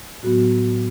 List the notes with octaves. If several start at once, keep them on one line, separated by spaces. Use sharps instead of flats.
A2 F#3 B3 F#4